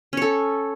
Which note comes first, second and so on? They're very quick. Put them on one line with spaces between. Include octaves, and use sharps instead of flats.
C#4 C#5 A4